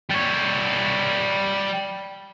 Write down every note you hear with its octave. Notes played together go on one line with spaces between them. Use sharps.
G3 C#5